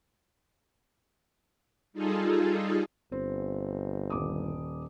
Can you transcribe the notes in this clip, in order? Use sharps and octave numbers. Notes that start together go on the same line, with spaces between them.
G3 D#4 F4 G#4 A4
G1 C4
D#1 D6 D#6